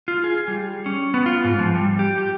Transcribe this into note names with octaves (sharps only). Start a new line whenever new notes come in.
F4
G#4
G3
C#4
B3
F4
G#2
F3
G3
G4
G4